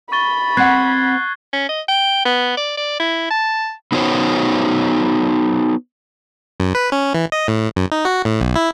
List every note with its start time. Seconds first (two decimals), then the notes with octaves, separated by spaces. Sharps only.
0.12 B5 C#6 A6 G7
0.57 C4 F#5 F#6 G#6 C7
1.53 C#4
1.69 D#5
1.88 G5
2.25 B3
2.57 D5
2.77 D5
3.00 E4
3.30 A5
3.92 B3 D#4 F#4 C5 C#5
6.60 F#2
6.75 B4
6.92 C#4
7.14 E3
7.32 D#5
7.48 A2
7.76 F#2
7.92 D#4
8.05 F#4
8.25 A2
8.41 B1
8.56 E4